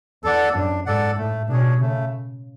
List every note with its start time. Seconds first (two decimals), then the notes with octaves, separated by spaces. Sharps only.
0.23 E2 A4 D5 F#5
0.54 F#2 D4
0.86 G#2 A4 D5 F#5
1.17 A2 A3
1.49 B2 D4 G#4 C#5
1.80 C#3 A3